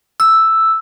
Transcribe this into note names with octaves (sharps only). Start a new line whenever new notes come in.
E6